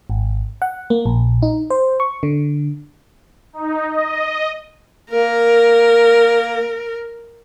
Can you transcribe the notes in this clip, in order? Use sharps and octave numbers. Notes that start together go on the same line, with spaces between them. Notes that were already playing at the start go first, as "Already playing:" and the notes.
G#1
F#5
A#3
A#1
D#4
C5
C#6
D3
D#4
D#5
A#3 A#4